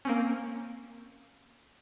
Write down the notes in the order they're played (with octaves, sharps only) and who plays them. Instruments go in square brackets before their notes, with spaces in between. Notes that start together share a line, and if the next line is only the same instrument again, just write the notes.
[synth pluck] A#3 C4 C#4